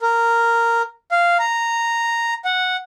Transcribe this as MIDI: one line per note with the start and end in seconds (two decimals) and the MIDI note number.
0.01 0.82 70
1.11 1.37 77
1.39 2.34 82
2.45 2.76 78